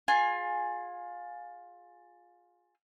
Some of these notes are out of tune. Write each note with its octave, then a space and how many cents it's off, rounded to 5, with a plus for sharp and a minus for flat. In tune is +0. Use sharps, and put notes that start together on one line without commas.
F4 +20 G#4 +0 G#5 +0